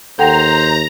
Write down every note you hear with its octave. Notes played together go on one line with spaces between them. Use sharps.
D#2 A4 C5 F#5 G5 A#5